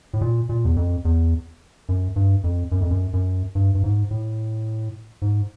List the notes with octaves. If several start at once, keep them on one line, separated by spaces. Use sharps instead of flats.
A2
A#2
A#2
E2
F2
E2
F#2
G2
F2
F#2
F2
F#2
F#2
G2
G2
G#2
A2
G#2